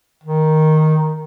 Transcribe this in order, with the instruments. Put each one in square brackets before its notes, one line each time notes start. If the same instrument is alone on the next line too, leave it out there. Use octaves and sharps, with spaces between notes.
[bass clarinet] D#3